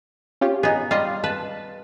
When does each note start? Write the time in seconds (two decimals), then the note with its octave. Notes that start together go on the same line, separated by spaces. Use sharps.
0.41 C#4 F4 G4
0.63 B3 D#4 G#4
0.91 G3 F4 D#5 F5
1.24 B4 A5